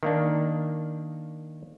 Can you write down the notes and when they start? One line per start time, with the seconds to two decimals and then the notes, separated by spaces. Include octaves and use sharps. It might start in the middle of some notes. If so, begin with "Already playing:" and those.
0.03 D#3 A#3 D4